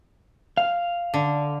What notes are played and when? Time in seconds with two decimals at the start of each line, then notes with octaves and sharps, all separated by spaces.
0.57 F5
1.14 D3